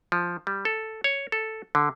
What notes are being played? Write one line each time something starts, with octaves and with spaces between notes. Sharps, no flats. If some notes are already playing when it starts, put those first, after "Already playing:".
F3
G3
A4
C#5
A4
D3